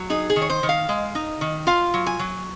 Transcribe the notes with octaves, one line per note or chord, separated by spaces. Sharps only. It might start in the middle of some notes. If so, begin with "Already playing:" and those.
Already playing: F#3
D#4 G#4
G#4
D#3
C#5
C5
D#3
F5
G#3
D#4
D#3
F4 F5
F#3
G#5
F#3